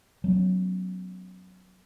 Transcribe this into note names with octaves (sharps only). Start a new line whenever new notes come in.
F#3 B3 C#4